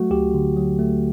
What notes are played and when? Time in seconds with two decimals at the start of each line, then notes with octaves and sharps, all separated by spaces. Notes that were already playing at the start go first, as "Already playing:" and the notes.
Already playing: F#3 A3 F#4
0.11 D2 G4
0.34 D3
0.56 F#3
0.79 A3